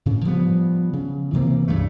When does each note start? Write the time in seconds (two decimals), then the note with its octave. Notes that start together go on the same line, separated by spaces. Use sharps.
0.06 A2 C#3
0.25 F3 G3 B3
0.93 C#3
1.33 C3 E3 A#3 C4
1.68 C#2 G2 C#3 A3